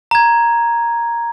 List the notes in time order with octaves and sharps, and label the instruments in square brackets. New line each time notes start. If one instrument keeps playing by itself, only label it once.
[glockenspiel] A#5 G#6